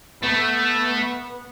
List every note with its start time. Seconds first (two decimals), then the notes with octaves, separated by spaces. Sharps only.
0.23 A3 B3